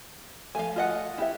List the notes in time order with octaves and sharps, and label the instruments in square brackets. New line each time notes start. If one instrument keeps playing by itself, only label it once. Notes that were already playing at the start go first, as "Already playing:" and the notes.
[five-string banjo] F3 A3 [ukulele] F5 G#5
[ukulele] F4 D#5 F#5
[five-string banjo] E4 G4 E5